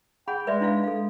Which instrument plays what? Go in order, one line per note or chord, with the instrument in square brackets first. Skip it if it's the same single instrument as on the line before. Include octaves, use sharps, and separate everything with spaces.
[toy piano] G#4 F#5 B5 [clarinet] G5
[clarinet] G#3 [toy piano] B4 D5 E5
[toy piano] D4 E4 F5
[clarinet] G#3 [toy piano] A4 F5